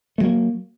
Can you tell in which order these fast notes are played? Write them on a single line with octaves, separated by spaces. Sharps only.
A3 F#3 A#3